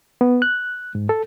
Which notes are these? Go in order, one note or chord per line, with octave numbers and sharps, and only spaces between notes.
B3
F#6
G#2
A4